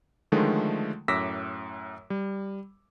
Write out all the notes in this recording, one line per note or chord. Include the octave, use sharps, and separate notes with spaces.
D3 D#3 F3 G#3 A3
F#2 A2 D6 E6 A#6 B6
G3